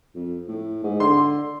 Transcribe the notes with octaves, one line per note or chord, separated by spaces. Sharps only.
F2
A2
G#2
D3 C6